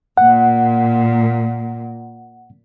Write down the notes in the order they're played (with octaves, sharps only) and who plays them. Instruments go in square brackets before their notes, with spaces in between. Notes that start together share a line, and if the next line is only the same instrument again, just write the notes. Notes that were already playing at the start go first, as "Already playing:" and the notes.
[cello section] A#2 [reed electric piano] F#5